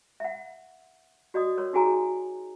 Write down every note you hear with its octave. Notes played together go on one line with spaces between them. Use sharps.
E5 F#5
F#4 D5 D#5 D#6
A#4 C#5 C6
D#4 F#4 G#4 G#5 A#5